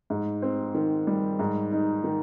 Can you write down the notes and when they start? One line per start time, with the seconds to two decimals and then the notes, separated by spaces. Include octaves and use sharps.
0.10 G#2
0.42 C4
0.74 D#3
1.07 G3
1.39 G#2
1.72 D#4
2.04 D#3